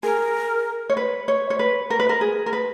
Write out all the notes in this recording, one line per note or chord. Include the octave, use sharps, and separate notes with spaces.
G#4 A#4
C#5
B4
C#5
C#5
B4
A#4
B4
A#4
G#4
A#4
B4